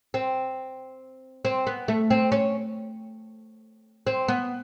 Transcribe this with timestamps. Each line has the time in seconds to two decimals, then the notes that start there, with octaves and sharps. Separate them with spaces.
0.14 C4
1.45 C4
1.67 B3
1.88 A3
2.10 C4
2.32 C#4
4.07 C4
4.28 B3